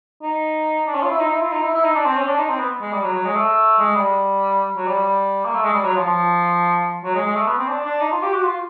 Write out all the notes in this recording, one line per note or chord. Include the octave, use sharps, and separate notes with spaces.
D#4
D4
C#4
F4
E4
D#4
E4
F4
D#4
E4
E4
D#4
D4
C4
C#4
D4
D#4
C4
B3
G#3
G3
F#3
F#3
G#3
A3
G#3
G3
F#3
G3
G3
A#3
A3
G#3
G3
F#3
F3
F3
F#3
G#3
G#3
A3
B3
C4
D4
D4
D#4
F4
G4
F#4
F4